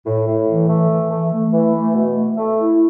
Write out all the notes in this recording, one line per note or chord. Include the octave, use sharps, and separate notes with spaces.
A2
A2
E3
A3
E3
A3
A3
E3
A3
B2
A3
A3
E4